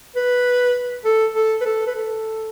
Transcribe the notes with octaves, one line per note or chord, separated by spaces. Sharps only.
B4
A4
A4
B4
A4
B4
A4